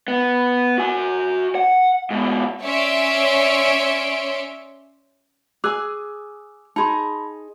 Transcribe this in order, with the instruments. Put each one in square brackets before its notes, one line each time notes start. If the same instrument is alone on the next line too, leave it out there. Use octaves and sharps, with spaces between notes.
[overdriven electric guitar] B3
F#4 G#5
F#5
G#2 B2
[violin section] C#4 C#5 D5 E5 C6 D7
[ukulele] G#4 G#5 [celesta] D6 E6 F#6
[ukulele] D#4 G#4 [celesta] A5 B5 C6